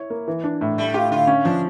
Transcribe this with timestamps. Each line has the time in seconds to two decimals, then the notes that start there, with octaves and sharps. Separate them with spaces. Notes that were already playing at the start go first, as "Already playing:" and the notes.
Already playing: E4 C#5
0.10 A#3
0.28 E3
0.44 D4
0.61 A2
0.78 G3 A3
0.94 F4 G4
1.11 D3 F4
1.27 C#4
1.45 F3 D4